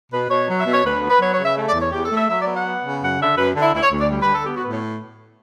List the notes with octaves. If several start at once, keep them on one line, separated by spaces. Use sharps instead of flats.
B2 B4
B2 C#5
F#3
E5
B2
C#5
D2 B4
B3
B4
F#3 C#5
C#5
C#3
E5
A3
D5
E2
C#5
E2 G4
A4
A3
E5
F#3 E5
D5
B3
F#5
B3
C#3
F#2 F#5
D3 E5
F#2 B4
D3
E4
D2 E4
C#5
D2
D5
G3
B4
D3
A4
B3 G4
F#4
A2 B4
C#5